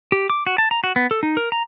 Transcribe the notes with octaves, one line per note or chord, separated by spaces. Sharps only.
G4
D6
F#4
A5
A#5
F#4
B3
A4
D#4
A#4
A#5